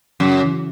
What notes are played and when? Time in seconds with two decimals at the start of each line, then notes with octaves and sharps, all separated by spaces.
0.20 F#2 C#3
0.43 E3